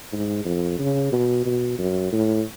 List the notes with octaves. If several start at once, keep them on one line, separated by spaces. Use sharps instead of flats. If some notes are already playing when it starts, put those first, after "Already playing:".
G#2
F2
C#3
B2
B2
F#2
A2